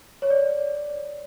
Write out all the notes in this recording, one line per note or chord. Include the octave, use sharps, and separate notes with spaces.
C#5
D5